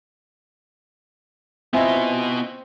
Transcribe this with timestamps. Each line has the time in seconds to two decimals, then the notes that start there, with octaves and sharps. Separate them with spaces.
1.73 B3 C4 E4 F4 D#5 G#5